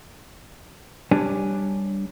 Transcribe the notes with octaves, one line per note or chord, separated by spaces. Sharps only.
G3 D4 C#5 D5 G#5